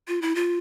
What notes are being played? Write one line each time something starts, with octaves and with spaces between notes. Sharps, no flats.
F4
E4
F4